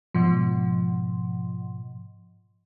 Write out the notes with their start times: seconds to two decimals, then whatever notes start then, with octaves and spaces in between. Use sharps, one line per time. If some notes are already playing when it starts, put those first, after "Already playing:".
0.14 G#2 B2 F3